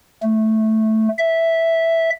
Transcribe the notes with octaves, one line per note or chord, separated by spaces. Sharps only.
A3
E5